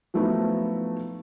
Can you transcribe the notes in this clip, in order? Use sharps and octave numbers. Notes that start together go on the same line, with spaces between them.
F3 F#3 A3 B3 D#4 E4